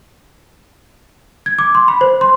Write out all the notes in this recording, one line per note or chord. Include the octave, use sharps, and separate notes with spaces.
G#6
D6
C6
B5
C5
C6